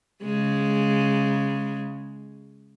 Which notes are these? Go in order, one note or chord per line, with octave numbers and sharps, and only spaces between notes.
C#3 G#3